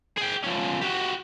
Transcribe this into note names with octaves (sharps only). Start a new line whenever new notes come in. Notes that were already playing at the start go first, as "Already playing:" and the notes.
G#4 G5
F3 C#4
F#4 G4